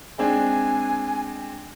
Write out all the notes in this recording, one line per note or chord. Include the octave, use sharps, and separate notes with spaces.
G#3 C4 D4 G#5